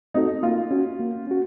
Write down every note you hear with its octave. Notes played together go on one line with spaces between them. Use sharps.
A3 C4 D#4 F#4 A4
A#3 F4
C#4 F#4
A#3
C#4 F#4